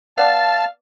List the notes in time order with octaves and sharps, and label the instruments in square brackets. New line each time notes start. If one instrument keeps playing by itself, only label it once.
[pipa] B3 D5 [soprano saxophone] F5 [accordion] A5